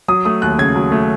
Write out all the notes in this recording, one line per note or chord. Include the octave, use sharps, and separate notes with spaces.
F#3 D#6
A3 D#6
D#2 F#6
C#3 G#6
F#3
A3